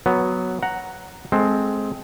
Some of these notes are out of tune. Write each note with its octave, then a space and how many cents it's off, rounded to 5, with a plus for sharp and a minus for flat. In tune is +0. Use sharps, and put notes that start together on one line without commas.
F#3 +0 B3 +0
F#5 +0 A#5 +0
G#3 +15 C4 +0 A4 +0